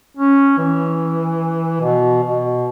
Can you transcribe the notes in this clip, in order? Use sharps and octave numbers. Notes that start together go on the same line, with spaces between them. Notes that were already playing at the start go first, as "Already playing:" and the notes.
C#4
E3
B2
B2